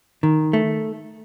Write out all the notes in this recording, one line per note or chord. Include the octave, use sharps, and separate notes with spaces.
D#3
A3